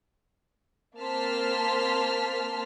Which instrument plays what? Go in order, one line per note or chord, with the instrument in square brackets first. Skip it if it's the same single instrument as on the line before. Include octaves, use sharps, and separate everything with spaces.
[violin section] A#3 C4 A5 C6 F6 B6